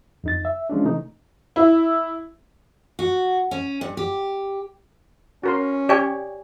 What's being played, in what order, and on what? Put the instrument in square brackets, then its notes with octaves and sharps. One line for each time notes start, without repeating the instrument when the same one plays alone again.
[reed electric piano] F2 D#4 A6
E5
F3 G#3 C#4 D4
C3 E3 A3 D#4
[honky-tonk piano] E4
[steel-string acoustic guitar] F#4
C#4
G2
G4
[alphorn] C#4 [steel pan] F#4 A#4 C6
[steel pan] G4 C#5 [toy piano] D5 G#5